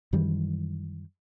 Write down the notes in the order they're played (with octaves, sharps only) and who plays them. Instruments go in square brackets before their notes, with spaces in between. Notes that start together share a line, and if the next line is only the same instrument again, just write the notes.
[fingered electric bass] F#2 D#3 E3 G3